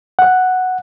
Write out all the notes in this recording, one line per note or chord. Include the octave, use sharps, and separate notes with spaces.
F#5